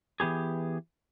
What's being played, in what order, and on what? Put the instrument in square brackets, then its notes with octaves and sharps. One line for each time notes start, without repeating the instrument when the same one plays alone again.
[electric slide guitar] E3 B3 G4 G#4